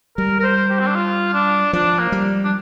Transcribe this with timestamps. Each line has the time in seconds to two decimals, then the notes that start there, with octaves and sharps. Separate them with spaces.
0.17 G3 A#4
0.40 A#4
0.43 C5
0.70 G4
0.80 C4
0.87 D4
0.95 F4
1.34 D4
1.73 F3 D4
1.99 A#3
2.12 G3
2.44 D4